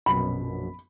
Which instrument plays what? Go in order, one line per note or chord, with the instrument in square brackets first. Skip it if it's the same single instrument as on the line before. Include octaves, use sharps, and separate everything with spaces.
[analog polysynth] A#1 F#2 B2 [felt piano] B5